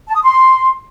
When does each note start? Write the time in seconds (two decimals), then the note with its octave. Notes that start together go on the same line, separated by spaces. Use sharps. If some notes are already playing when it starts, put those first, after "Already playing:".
0.07 A5
0.15 D#6
0.22 C6